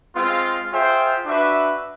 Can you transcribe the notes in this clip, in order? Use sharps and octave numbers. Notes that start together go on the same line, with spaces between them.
G#3 C4 F4
F4 G#4 C5 E5 G5
D4 F#4 B4 E5